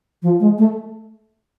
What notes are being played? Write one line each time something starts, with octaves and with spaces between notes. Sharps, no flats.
F3
G#3
A3